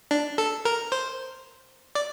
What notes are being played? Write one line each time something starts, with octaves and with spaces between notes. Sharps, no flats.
D4
A4
A#4
C5
D5